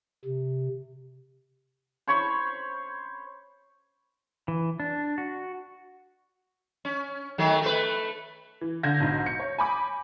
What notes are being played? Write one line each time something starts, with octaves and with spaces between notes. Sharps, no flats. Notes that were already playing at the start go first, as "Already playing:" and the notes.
C3
C5 C#5 B5 C#6
E3
D4
F#4
C#4
D#3 F#3 A3
A3 B4
E3
D3 G6 G#6 A#6
B1 G#2
C#7
C#5
G#5 B5 D6